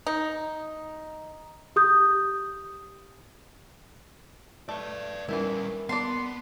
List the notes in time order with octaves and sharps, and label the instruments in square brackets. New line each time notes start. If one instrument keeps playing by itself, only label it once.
[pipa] D#4
[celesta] G4 D#6 G6
[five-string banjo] A3 [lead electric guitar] B4 D5
[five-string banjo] E3 B3 E4 [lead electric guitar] G3 C#4 [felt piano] A#4
[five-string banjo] A#3 D4 D5 [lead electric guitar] B3 [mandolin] C6